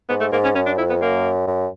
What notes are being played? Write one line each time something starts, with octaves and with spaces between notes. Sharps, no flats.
G#2 B3
A3
G#2 A#3
C#4
F#2 C#4
D4
F2 E4
B3
F#2 A#3
F#2